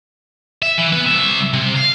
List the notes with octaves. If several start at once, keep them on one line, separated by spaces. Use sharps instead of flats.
E5
E3
B3 B4
C2 E5
C3
F5